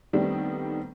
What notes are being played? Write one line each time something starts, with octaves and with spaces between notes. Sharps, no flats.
D#3 G3 A3 B3 C4 D4